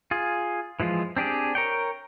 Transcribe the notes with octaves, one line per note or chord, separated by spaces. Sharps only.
F4 G#4
E3 F3 G#3 F4
C4 D4 G4 G#4
A#4 C#5 G5